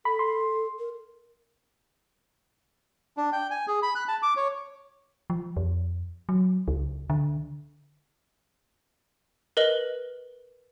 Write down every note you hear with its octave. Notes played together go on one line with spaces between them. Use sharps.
A4 B5
C6
A#4
D4
G5
G#5
G#4
B5
F#6
A5
D6
C#5
F3
F2
F#3
C#2
D3
A#4 B4 D#5 F#7